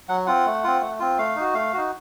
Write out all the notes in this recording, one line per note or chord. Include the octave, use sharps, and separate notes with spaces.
F#3 F#5
C4 F4 F#5
A3
C4 F4
A3
C4 F4
A3 F5
D#4 F#4
A3 F5
D#4 F#4